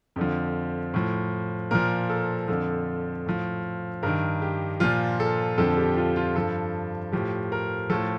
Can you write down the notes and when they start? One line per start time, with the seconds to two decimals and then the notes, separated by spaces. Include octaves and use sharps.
0.16 F2 D3 F3
0.94 A2 F3
1.71 A#2 F3 A#4
2.10 A4
2.48 F2 D3 F3 A4
3.26 A2 F3
4.03 G2 D#3 A#4
4.42 G4
4.80 A#2 F3 F4
5.20 A4
5.58 F2 D3 F3 A4
5.77 G4
5.97 F4
6.16 F4
6.35 G2 F3 A4
7.12 A2 F3 G4
7.52 A#4
7.90 A2 F3 A4